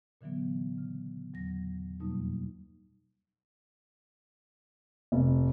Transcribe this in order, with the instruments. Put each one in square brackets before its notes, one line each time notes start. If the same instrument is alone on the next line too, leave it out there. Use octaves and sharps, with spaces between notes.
[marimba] A#2 D3 E3 F#3 B3
C#3
E2 F#3 A#6
F2 B2 F#3 G3 A#3 D#4
[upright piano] F1